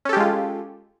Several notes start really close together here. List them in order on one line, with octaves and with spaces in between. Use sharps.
C#4 A4 G4 G#3 F4